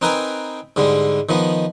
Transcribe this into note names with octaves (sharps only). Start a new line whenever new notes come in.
C4 D#4 A#4 B4 G5 G#5
G#2 D3 G3 G#3
D#3 F3 B3 D#5